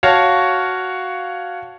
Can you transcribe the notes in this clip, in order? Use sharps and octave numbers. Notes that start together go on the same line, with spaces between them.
F#4 C#5 F5 A5